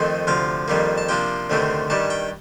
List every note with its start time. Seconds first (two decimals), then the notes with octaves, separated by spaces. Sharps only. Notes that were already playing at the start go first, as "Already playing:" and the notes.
Already playing: F2 D#3 A3 C4 D#4
0.27 D2 C3 F3 F5
0.68 F2 D#3 G3 A#3
0.98 A5
1.08 C3 F3 A#3 D4 G5
1.50 D2 C3 D#3 A3 C4
1.90 G2 D#3 G3 A5
2.10 G5